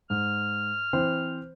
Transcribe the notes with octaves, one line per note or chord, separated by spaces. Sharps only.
G#2 F6
E3 C4 C5